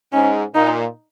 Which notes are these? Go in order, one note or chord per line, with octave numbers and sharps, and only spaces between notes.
G#2 C#4
A#2 D#4